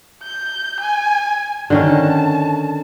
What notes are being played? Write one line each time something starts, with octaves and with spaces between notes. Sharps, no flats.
G6
G#5
D3 D#3 C#4 A5